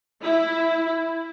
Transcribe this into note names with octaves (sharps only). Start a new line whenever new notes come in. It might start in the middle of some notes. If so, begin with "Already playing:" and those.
E4